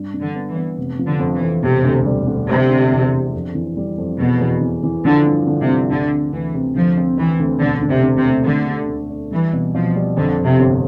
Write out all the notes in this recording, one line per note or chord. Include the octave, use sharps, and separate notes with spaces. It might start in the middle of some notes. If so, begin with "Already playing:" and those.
Already playing: G2
G2
D3
B3
E3
B3
F1
F3
D3
F2
E3
F2
E1 C3
D2
G3
D3
F1 C3
D3
E2
D3
F2
E3
G3
F2
E2 B2
E2
E3
E3
D3 F3
G2
D3
C3
G2
D2 D3
C3
D2 E3
C3
D2 F3
C4
E3 C4
D2
E1 D3
D3
C3
D3
C3
A3
D3 A3
A3
D2
D4
E3 G3
B2
B2 F3
G3
F2 D3
F2
C3
G1